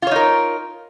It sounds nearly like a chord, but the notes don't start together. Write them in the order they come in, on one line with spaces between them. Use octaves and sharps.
F4 C#5 D#4 A#4